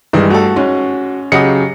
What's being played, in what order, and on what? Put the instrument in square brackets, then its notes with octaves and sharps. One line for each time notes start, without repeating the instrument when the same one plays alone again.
[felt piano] G2 [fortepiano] D#3 [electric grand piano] E3 G#3
[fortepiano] A3 A4 [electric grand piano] F#4
[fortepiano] G#2 [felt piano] C#4
[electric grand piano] C#3 F#3 G4 [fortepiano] D#5 F#5 D#6 [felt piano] C#7